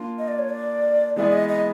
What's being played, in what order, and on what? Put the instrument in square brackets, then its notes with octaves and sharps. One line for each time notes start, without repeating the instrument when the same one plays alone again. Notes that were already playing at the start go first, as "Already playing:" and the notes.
Already playing: [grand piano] A#3 D4 F4
[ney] D#5
D5
C#5
D5
[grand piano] E3 G#3 B3 E4 G#4 [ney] D5
[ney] D#5
D#5